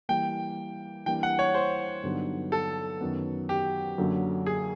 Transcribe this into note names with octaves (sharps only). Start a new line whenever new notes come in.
E3 G3 A#3 G5
E3 G3 A#3 D4 G5
F#5
C#5
C5
G2 D3 F#3 B3 D#4
A4
F#2 D#3 F#3 B3
G4
F#2 D3 F#3 A#3
G#4